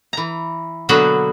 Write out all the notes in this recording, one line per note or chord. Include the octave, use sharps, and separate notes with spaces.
E3 A#5
B2 D3 F#3 A#3 B3 F#4